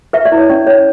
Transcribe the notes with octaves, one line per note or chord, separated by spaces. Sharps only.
B4 E5
D5
E4
C#5
C#4 D5
C#4 C#5